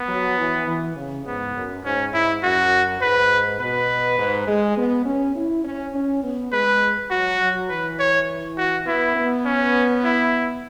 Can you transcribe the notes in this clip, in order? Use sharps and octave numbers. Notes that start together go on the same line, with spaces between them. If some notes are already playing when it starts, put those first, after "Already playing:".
Already playing: B3
F#3
E3
E3
C#3
G#2 B3
F#2
G#2 C#4
G#2 E4
F#2 F#4
G#2 B4
B2 B4
G#2
G#3
B3
C#4
E4
C#4
C#4
B3
G#3 B4
F#3 F#4
F#3
E3 B4
C#5
F#4
B3 E4
B3
C#4
E4